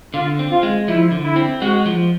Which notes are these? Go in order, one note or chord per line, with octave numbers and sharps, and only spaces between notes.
D3 F4
C4
F4
G#3
F3 E4
D3
E4
C4
G#3 F#4
F3